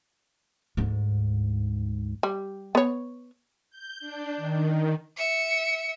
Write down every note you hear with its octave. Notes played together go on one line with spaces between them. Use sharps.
D2 G#2
G3
B3 C#5
G6
D4
D#3
E5 C#7